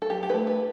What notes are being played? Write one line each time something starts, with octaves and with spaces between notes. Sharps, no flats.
A4
F#3 G4
G4
B4
A3 E4 A4
B4